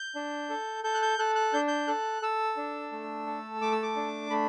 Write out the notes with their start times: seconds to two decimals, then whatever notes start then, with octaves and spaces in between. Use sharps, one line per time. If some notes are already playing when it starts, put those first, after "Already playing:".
Already playing: G6
0.15 D4
0.50 A4
0.84 A4 G6
0.94 F#6
1.02 G6
1.19 A4 F#6
1.35 F#6
1.53 D4 G6
1.68 G6
1.88 A4 F#6
2.22 A4 E6
2.57 D4
2.92 A3
3.27 A4
3.61 A3 D6
3.72 E6
3.82 D6
3.96 D4
4.30 A3 B5